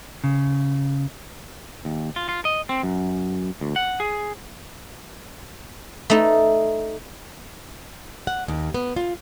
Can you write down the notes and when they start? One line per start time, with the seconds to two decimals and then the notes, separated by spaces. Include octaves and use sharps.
0.24 C#3
1.85 D#2
2.16 F4
2.29 F4
2.45 D#5
2.69 C4
2.83 F#2
3.61 D2
3.76 F#5
4.00 G#4
6.10 A3 D#4
8.27 F#5
8.48 D#2
8.74 B3
8.96 F4